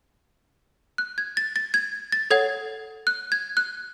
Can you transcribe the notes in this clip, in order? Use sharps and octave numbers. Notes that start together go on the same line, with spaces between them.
F#6
G#6
A6
A6
G#6
A6
A4 C#5 F#5 G#6
F#6
G#6
F#6